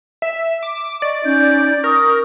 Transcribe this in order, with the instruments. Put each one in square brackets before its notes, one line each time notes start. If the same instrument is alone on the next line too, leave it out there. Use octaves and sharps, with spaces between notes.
[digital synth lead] E5
D6
[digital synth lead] D5 [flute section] D#5 C#6
[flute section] C#4 D#4 G6
[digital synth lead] A#4 [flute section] C#6 D#6